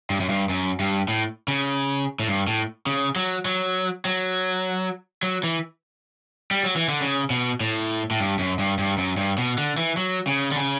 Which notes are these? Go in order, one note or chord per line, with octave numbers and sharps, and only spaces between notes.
G2
F#2
G2
F#2
G2
A2
C#3
A2
G2
A2
C#3
F#3
F#3
F#3
F#3
E3
G3
F#3
E3
D3
C#3
B2
A2
A2
G2
F#2
G2
G2
F#2
G2
B2
D3
E3
F#3
C#3
D3
C#3